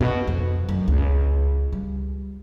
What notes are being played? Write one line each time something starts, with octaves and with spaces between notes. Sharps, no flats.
B2
F2
F#2
C#2
G3